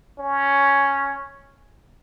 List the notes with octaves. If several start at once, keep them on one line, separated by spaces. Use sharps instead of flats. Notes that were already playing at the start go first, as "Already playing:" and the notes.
C#4